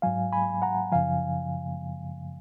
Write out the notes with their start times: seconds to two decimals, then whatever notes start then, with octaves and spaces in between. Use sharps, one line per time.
0.02 G#2 F#3 F5 G#5
0.33 G#5 B5
0.62 F#5 A#5
0.92 F#2 C#3 F3 F5 G#5